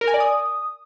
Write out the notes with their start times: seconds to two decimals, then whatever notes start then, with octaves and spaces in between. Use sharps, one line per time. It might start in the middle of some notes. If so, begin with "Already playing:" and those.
0.01 A#4
0.08 G#5
0.14 D5
0.20 D#6